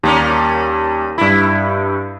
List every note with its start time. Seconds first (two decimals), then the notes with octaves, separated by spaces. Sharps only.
0.03 D#2 G3 A#3 C#4
1.18 G2 E4 B5